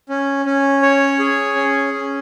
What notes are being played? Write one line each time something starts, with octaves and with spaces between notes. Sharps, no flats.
C#4
C#4
C#5
G#4
C#4
C#4